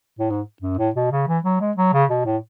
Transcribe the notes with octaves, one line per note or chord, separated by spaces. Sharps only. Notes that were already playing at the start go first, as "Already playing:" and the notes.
A2
G#2
F#2
A2
B2
C#3
E3
F#3
G#3
F#3
C#3
B2
A2